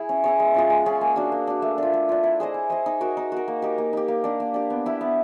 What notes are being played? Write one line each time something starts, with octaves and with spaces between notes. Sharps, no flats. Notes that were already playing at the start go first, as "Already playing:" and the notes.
Already playing: E4 G#4
C#4
E4 G#4 C#5
G#3
C#4 F4 G#4
G#3
C#4 F4 G#4
A#3
D4 F#4
A#3
D4 F#4
A3
D4 F4
A3
D4 F4
E4
G#4 C5 D#5
E4
G#4 C5 D#5
D#4
F#4 A#4
D#4
F#4 A#4
A#3
D#4 G4
A#3
D#4 G4
A#3
D4 G4
A#3
D4 G4
B3
E4 G4 B4
B3